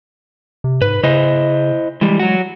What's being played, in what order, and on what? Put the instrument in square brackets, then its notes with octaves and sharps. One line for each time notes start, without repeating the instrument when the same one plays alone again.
[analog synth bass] C3
[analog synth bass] G#2 [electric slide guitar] B4
[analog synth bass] C#3 [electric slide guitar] E4 C5 D#5
[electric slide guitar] E3 G3 [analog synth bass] G#3
[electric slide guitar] F#3 F#4